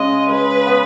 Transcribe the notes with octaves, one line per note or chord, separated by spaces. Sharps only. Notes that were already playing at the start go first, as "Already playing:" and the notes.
Already playing: C#3 G#3 D#5
G#3 B4
B3